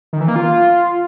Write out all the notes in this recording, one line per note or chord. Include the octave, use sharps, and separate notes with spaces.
D#3
E3
A#3
F4